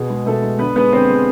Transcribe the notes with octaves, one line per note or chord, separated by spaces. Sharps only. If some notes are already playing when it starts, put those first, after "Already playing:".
Already playing: B2 G#4
G#3
B2 A3 A4
G#3
D3 B3 B4
G#3 B3 B4
D3 C4 C5
G#3